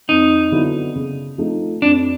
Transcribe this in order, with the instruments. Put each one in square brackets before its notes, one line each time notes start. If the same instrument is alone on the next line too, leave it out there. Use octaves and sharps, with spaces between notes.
[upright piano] F2 [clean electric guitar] D#4
[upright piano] D3 F#3 B3 E4
C#3
F3 A3 C4 D#4
[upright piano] F2 [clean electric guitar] D4